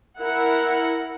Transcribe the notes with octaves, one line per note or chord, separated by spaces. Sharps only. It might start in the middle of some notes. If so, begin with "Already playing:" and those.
E4 A#4 F#5